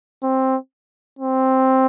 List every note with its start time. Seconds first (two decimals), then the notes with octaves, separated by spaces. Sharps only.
0.23 C4
1.19 C4